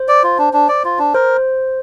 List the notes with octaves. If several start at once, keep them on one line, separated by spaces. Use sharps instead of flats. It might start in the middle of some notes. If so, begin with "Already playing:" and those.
Already playing: C5
D5
F4
D4
D4
D5
F4
D4
A#4 C5